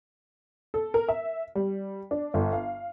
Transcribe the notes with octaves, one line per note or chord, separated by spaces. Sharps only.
A4
A#4
E5
G3
D4
G1
F5